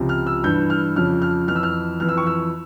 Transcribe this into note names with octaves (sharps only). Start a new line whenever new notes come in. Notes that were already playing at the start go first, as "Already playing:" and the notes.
Already playing: C#2 C3 F3
F6
E6
G2 E3 G6
F6
F2 C#3 F3 F6
F6
F2 E3 F6
E6
F6
F2 E3 F6
E6
C#6
E6